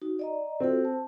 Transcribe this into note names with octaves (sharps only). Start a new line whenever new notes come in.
D#4 F#4
D5 D#5 A#5
C4 F4 F#4 A4
A5